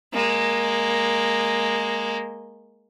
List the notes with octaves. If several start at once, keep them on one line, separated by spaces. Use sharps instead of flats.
G#3 A#3